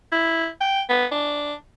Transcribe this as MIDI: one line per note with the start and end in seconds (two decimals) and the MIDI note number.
0.12 0.47 64
0.61 0.81 79
0.89 1.06 59
1.11 1.54 62